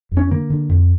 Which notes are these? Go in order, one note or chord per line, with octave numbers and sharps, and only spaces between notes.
F2
C#4
D3 A#3
D3
F2